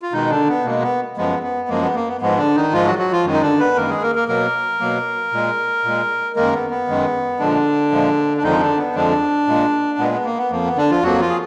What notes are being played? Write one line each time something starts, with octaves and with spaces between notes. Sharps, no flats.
F4
B2 D#3 G#3 D#4
D3 D4
B3
B2 G#3 A#3
B3
F#2 F3 G#3 B3
B3
F#2 F3 G#3 A#3
B3
A#3
B3
G#2 F3 G#3 B3
D3 D4
D#3 D#4
G#2 F3 G#3 F4
F#3 F#4
F#3 F#4
F3 F4
F#2 D#3 G#3
D#4
D3 D4
B3 B4
F#2 D#3 G#3 A#3 A#4
G#3 G#4
A#3 A#4
A#3 A#4
B2 F#3 A#3 A#4
B2 F#3 A#3
A#2 G#3
A#2 G#3
F#2 D#3 G#3 A#3 A#4
B3
B3
F#2 D#3 G#3
A#2 D3 F3 G#3 D4
A#2 F3 G#3
D4
F2 D3 D#3 F3 G#3 D#4
D3 D4
B3
F2 D3 F3 G#3 D4
A#2 G#3
A#2 G#3 B3
B3
A#3
B3
F2 F3 A#3
B3
D3 D4
F3 F4
F2 F3 F#3 A#3 F#4
F3 F4
G#4